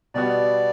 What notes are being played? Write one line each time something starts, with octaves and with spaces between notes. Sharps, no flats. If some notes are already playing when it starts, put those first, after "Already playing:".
B2 G3 B3 F#4 D5